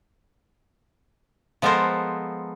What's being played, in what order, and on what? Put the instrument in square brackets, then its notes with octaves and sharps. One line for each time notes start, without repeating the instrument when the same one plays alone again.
[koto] F3 G#3 B3 A4 A#4 C5